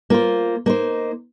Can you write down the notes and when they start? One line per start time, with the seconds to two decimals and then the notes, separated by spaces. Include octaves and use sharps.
0.10 A#3 F4 C5
0.66 A#3 D#4 C5